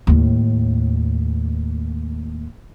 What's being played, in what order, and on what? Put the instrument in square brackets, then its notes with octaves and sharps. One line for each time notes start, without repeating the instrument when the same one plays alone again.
[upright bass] D#2 A2